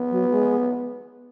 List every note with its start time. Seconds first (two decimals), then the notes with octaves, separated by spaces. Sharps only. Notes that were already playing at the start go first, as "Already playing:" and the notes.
Already playing: B3
0.10 F#3
0.31 G#3